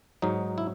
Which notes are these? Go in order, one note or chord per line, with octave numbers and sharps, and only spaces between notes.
G#2 F#3 D#4
E4